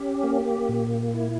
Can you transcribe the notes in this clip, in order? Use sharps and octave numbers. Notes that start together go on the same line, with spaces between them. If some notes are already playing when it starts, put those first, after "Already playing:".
Already playing: C#4 G4
A#3
A#2
E4